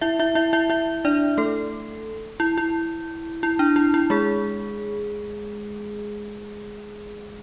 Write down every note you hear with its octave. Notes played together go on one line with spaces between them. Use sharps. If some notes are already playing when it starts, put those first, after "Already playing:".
E4 E5
E4 E5
E4 E5
E4 E5
E4 E5
D4 D5
A3 A4
E4
E4
E4
D4
E4
E4
G#3 G#4